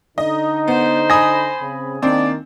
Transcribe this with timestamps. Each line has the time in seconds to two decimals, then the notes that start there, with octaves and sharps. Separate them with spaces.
0.18 D3 D#4 D#5
0.68 B3 C5
1.10 G#5 B5 D#6 A#6
1.60 C#3 C4
2.02 D#3 A#3 C4 D4 D5